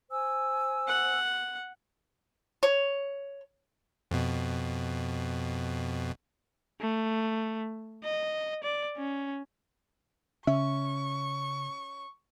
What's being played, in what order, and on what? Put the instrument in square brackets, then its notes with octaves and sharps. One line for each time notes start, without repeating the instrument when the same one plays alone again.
[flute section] C5 G#5 E6
[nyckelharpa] F#5
[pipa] C#5
[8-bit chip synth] F2 B2
[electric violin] A3
D#5
D5
C#4
[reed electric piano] C#3 [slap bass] C#4 [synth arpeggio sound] E5 [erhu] C#6